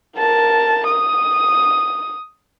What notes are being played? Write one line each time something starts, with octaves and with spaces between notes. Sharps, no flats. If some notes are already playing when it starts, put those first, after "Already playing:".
A#4 A5
D#6